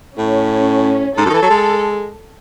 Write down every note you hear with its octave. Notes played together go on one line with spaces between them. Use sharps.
A2 C#4
G#2 A4
F#2
D#3
E3
F#3
G#3